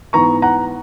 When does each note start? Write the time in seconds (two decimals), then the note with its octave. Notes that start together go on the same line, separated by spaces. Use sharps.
0.13 G#2 E3 B3 A#5 C#6
0.42 F#5 A#5